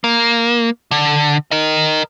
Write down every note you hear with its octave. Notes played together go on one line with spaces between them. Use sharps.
A#3
D3
A#4 D#5